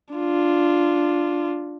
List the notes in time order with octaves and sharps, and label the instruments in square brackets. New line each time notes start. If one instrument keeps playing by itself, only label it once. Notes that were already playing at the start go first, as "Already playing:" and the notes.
[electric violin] D4 F4